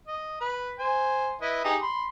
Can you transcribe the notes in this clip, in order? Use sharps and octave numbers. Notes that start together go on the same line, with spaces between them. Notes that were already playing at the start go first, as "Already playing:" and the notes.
D#5
B4 B5
C5 G#5
E4 B4 D#5
D#4 G4 G#4
B5 C6